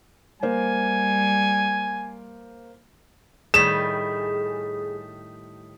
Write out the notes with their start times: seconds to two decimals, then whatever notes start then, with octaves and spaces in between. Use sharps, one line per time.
0.43 G3 A#3 C5 G#5
3.54 A2 D#3 G3 G#4 D#6 B6 E7